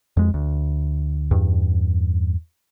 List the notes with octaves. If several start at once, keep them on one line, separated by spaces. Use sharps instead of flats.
F2 G#3
D2
E2 G2